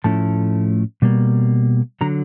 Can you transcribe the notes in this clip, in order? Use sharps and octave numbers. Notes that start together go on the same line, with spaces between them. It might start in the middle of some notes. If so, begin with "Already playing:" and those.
A2 F3 A3 C#4 E4 A5
B2 G3 A#3
D3 F#3 A#5